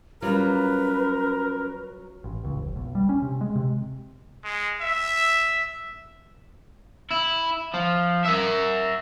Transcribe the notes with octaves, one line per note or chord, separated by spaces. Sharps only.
F#3 G3 C#4 F4 A#4 B4
A1
C#2
F1
B1
G3
C#4
C3
G#3
C3
G#3
E5
E4
F3
A#4 E5